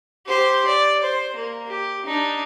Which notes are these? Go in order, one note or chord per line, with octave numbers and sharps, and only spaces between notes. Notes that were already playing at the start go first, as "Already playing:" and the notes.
G4 C5
D5
C5
A#3
G4
D4 D#4